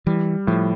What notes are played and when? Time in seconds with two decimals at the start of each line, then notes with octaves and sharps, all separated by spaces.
0.07 E3 G3
0.47 A2 F3